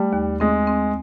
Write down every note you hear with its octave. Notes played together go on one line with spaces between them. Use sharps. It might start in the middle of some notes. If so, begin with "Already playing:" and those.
Already playing: G3 A3
D#2
G#3 C4
C4